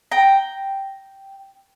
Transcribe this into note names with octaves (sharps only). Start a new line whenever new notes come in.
G5 A#5